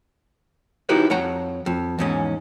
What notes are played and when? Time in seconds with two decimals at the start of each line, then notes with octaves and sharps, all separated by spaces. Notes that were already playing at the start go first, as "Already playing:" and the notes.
0.89 D#4 E4 F#4 G4 B4 C#5
1.10 F2 C#5 F#5 A#5
1.66 F2
1.99 E2 G#2 C#4